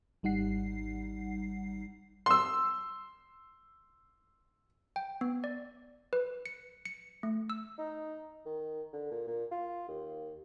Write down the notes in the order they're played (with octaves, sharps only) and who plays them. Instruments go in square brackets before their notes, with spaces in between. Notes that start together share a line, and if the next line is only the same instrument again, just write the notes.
[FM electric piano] G#1 G3 D#4 F#5 C7
[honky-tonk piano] C6 E6
[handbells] G5
B3
D5
B4
C#7
C#7
A3
E6
[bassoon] D#4
D#3
D3
A#2
A#2
F4
D#2